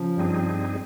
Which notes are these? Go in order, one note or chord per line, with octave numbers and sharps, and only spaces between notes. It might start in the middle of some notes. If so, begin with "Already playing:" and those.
Already playing: C#3 F3
G2 G3 C4 D#4 G#4